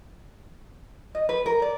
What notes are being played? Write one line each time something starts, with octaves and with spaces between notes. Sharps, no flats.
D#5
B4
A#4
D5